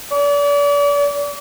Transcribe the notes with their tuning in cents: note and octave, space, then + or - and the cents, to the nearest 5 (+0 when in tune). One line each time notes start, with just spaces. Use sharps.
D5 -40